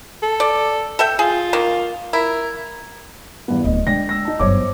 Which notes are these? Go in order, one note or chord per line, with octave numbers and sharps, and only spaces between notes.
A4
D5
A4 E5 G5
F4 G#4
D#3 A#3
E4 A#4
E2 G2 B3
D1 D2 D#5
D3 G#3 D5 G5 A#6
E6 A#6
D#4 A5
G1 F#2 C5 C#5 D6